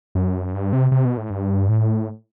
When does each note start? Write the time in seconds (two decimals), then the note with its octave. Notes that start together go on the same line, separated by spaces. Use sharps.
0.15 F#2
0.54 G2
0.73 C3
0.92 C3
1.05 B2
1.17 A2
1.30 G2
1.69 A2